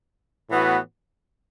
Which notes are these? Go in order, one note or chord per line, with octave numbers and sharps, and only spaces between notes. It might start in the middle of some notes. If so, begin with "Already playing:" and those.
A2 E3 B3 F#4